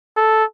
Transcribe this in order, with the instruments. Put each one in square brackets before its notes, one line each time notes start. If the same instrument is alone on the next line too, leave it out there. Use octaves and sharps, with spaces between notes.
[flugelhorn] A4